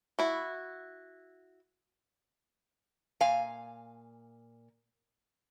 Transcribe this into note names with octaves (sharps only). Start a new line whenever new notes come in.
E4 F#4
A#2 F5 G#5